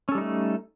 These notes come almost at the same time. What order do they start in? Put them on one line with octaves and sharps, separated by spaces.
C#4 A4 G3 D#4 A3